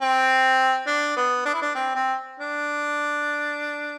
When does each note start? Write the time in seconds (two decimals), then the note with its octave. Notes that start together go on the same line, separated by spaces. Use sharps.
0.02 C4
0.87 D4
1.17 B3
1.45 D4
1.54 E4
1.62 D4
1.75 C4
1.95 C4
2.40 D4